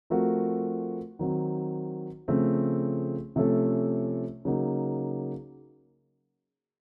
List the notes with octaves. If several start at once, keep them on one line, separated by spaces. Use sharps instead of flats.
F3 A3 C4 F#4 A#4
D#3 F#3 C4 F#4
C#3 F3 A3 C4
C3 F3 A3 C#4 A4
C#3 F#3 A#3 D#4